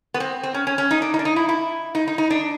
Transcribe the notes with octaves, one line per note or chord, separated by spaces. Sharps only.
B3
C4
C4
C#4
C#4
C#4
D#4
D4
D#4
D4
D#4
E4
E4
D#4
D#4
D#4
D4